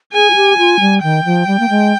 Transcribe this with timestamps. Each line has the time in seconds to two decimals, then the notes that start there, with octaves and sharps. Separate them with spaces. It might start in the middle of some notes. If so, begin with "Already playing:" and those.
0.13 G#4 G#5
0.30 F4
0.35 G4
0.58 F4
0.80 G3
1.03 D#3 G5
1.25 F3
1.47 G3
1.60 A#3
1.69 G#3